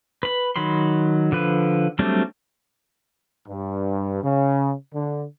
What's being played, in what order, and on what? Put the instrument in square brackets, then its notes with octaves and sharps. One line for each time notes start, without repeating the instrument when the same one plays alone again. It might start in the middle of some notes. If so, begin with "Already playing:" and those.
[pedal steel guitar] B4 B5
D#3 F#3 B5 C6
D3 F3 B4
F#3 G3 A3 C4 D4
[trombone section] G2
C#3
D3